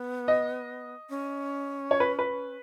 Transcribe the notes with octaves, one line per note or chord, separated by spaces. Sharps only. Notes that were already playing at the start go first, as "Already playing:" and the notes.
Already playing: B3
D#5
C#4
C#5
B4
B4